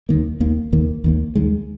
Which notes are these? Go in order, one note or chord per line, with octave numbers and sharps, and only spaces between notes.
D#2 D#3 A#3
D#2 D#3 A#3
D#2 D#3 A#3
D#2 D#3 A#3
D#2 D#3 G#3